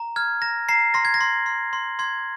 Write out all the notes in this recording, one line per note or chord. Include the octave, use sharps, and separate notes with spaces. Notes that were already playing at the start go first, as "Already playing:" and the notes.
Already playing: A#5
F6 G#6
A#5 A#6
A#5 C7
C6 A#6
G#6
A#6
C6
C6
C6
C6 G#6